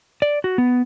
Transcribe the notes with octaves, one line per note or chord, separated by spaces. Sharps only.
D5
F#4
B3